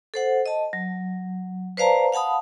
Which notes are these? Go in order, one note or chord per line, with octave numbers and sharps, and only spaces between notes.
A4 C5 F#5
D#5 A5
F#3
B4 C5 D5 F5 A5 A#5
F5 F#5 A5 B5 D#6